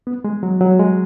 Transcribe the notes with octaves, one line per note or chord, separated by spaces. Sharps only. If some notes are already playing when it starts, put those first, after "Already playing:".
B3
G#3
F#3
F#3
G#3